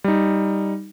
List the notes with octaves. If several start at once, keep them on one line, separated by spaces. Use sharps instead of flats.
G3 D#4